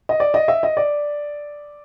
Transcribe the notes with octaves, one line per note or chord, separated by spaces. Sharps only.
D#5
D5
D#5
E5
D#5
D5